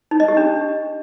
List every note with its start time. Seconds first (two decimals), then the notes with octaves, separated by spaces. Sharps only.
0.11 D#4
0.20 D#5
0.28 G4
0.37 D4